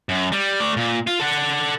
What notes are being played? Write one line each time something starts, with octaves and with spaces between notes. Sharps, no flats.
F#2
G3
A3 D5
A#2
F4
A4 F#5